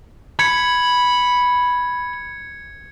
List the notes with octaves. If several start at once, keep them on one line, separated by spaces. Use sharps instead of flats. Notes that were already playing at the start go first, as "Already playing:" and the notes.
B5 G#6 C#7